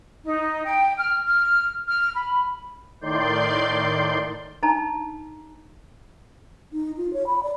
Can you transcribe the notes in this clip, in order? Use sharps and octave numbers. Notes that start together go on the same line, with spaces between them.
D#4
G5
F6
F6
F6
B5
A2 D#3 D5 C6 G6
D4 D#4 A5 A#5
D#4
F4
C#5
B5
D5